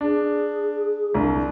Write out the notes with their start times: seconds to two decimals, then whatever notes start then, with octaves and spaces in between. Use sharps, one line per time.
0.01 D4 G#4
1.14 C2 D4